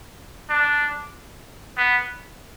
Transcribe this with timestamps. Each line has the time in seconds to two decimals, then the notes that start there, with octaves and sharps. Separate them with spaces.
0.49 D4
1.77 B3